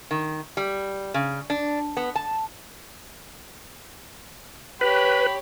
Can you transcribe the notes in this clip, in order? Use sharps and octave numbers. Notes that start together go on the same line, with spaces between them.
D#3
G3
C#3
D4
B3
A5
G4 B4 C#5 B5